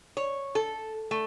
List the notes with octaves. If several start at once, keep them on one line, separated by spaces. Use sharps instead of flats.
C#5
A4
A3